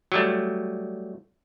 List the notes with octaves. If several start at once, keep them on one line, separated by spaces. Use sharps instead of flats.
F#3 G3 A3